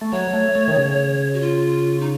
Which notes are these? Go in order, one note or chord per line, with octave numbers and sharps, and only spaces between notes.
A3
F#3 C#5
A3
A3
D#3
C#3
F#4
F4
D#4